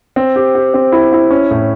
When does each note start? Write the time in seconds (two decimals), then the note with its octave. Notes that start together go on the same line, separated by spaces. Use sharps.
0.16 C4
0.36 G4
0.55 G4
0.74 C4
0.92 E4
1.13 E4
1.31 C#4
1.51 A2